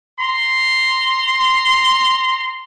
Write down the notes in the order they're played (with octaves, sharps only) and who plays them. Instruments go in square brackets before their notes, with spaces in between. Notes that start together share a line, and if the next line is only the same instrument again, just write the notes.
[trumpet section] A#5 C6